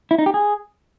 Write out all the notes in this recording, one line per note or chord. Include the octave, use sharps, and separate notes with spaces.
E4
D#4
G4
G#4